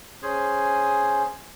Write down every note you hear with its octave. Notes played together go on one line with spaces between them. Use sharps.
C#4 G#4 C5 G#5